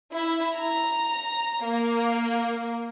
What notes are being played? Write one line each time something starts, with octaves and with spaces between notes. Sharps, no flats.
E4
A#5
A#3